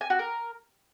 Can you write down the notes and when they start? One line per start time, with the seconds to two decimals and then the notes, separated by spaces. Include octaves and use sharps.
0.01 G#5
0.10 F#4
0.19 A#4